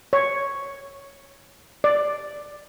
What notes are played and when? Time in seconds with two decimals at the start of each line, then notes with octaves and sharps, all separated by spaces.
0.13 C#5
1.84 D5